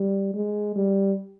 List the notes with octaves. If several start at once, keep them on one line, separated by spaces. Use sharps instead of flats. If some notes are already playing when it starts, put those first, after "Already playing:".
Already playing: G3
G#3
G3